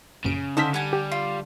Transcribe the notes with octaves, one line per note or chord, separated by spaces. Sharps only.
A#1 F#2 C#3 D7
D3 D4 D#4 A4 C5 D#5 F6 B6
G3 F#5 G#5
G4
F4